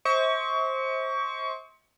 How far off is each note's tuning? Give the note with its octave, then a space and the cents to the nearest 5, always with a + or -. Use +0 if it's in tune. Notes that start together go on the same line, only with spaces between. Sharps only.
C5 +20 E5 -45 C#6 +25